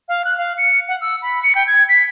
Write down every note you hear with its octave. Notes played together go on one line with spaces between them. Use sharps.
F5
F#6
F5
C#7
F#5
E6
B5
C#7
G5
G#6
B6